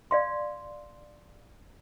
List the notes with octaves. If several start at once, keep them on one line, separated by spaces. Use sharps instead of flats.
D5 F5 C6